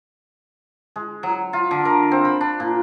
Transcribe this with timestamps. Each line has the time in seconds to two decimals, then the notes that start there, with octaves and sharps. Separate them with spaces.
0.96 G#3
1.23 F#3
1.53 F4
1.71 D3
1.85 A#4
2.11 C4
2.25 B5
2.41 D4
2.60 A#2